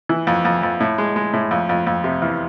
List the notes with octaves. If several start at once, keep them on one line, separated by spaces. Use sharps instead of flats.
E3
F2
F2
F2
A2
G#3
G#3
A2
F2
F2
F2
C3
E2